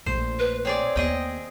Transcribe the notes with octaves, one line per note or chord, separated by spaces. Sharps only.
A#1 A3 C5
B4
C4 G#4 C#5 D5
D#2 B3 G#4 D#5 G5